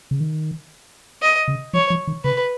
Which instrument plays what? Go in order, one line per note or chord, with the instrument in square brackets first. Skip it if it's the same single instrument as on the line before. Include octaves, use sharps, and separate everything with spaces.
[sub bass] C#3
D#3
[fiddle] D#5
[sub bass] C#3
[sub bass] F3 [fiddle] C#5
[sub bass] F3
D#3
[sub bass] C#3 [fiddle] B4